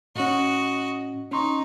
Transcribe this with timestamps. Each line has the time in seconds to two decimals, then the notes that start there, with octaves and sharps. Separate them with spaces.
0.16 A2 C#4 F#4 D#5
1.32 C#4 D#4 C6 C#6